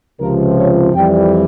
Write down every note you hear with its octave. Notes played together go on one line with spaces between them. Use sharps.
C#2 C3 F3 A#4
C#5
F2 E3 G3 G5